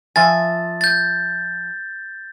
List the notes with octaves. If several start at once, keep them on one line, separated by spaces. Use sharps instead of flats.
F3 E5 G#5 A6
G6 A6